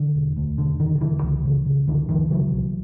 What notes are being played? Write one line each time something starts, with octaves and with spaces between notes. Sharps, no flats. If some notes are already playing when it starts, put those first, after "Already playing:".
Already playing: D3 E3
E1
D2
E1 D3
D3 D#3
D#3
E1 D3 E3
C#2
C#3
C#3
C#2 D3 E3
C#2 D#3 F3
C#3 E3 F#3
B1